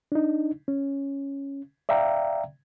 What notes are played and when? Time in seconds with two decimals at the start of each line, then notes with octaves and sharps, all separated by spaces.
0.12 D4 D#4
0.68 C#4
1.89 D5 E5 F5 G5 A#5